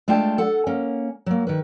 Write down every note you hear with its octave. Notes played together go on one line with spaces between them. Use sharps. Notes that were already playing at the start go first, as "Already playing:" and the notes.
G#3 A3 D4 F4 G5 A5
A4 F#5
A#3 C#4
F#3 A#3
D#3 B4